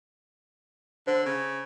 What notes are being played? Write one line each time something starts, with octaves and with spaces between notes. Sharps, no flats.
D3 C5
C#3